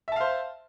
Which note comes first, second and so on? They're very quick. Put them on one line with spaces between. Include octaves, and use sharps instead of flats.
E5 A5 F5 C5